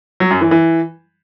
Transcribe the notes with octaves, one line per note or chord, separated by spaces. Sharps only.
F#3
F#2
E3
E3